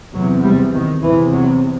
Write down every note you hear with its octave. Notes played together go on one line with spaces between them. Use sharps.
E2 C3 F#3
G3
D#3
E2 C3 E3
F#3